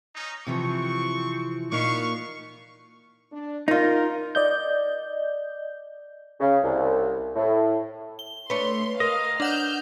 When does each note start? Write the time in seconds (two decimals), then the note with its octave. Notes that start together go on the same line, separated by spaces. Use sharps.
0.15 C#4 D#4
0.47 C3 E3 F3 C4 C#6
1.71 A#2 A#3 B3 D#4 F5 C#6
3.31 D4
3.68 D#4 F4 A#4
4.35 D5 D#5 G6
6.40 C#3
6.63 C2
7.35 A2
8.19 G7
8.50 A3 D4 B4 C#5 C6
9.00 A#4 D#5 F5
9.40 D4 F#5 F6 G6 E7